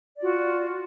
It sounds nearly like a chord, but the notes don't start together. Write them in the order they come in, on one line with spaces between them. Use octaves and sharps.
D5 F4 F#4